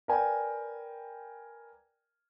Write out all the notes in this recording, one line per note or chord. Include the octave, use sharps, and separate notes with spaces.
A#4 B4 D5 G5 G#5